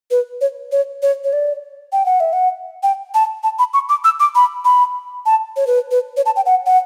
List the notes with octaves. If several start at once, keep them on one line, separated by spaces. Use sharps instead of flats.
B4
C#5
C#5
C#5
C#5
D5
G5
F#5
E5
F#5
G5
A5
A5
B5
C#6
D6
E6
D6
B5
B5
A5
C#5
B4
B4
C#5
A5
G5
F#5
F#5